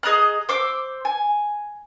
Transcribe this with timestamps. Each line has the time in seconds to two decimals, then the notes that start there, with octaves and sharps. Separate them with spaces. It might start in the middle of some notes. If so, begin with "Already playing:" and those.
0.03 G#4 D#5 A#5 F#6
0.49 C5 D6 E6
1.05 G#5